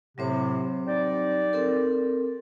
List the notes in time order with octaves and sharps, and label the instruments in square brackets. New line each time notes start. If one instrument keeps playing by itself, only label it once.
[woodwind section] A2 C3 [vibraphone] F#3 C4 C5
[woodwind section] G3 D#4 D5
[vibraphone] C4 A4 A#4